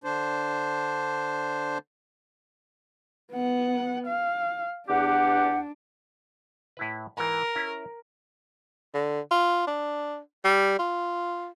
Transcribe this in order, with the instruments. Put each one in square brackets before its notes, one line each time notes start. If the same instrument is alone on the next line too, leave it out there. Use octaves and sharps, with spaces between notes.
[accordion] D3 D4 C5
[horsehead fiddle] B3 F#5
F5
[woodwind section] E2 G4 F#5 [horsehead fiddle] D4
[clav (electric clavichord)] A2 E4 B4
[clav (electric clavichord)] G#2 E3 [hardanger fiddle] A#4
[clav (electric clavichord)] C#4 E4
[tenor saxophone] D3
F4
D4
G3
F4